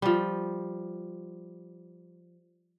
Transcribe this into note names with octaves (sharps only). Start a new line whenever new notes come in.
F3 G3